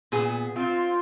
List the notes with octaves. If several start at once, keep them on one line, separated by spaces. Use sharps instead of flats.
A#2 B3 G#4
C4 F4 C6